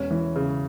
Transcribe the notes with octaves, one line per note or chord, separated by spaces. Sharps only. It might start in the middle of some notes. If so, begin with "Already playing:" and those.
Already playing: E1 C#4
E3
C#3